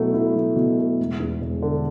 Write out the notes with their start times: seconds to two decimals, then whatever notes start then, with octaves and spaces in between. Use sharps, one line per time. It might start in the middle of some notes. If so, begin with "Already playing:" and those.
Already playing: B2 F#3 A3 E4
0.14 E4
0.35 F#3
0.56 B2
0.78 A3
0.99 E1
1.20 E2
1.41 E1
1.62 D3